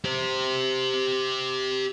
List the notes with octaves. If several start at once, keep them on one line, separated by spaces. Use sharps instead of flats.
G4 C5